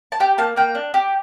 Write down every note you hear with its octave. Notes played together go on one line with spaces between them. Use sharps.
A5
G4 G5
A#3 A5
A#3 G5
D4
G4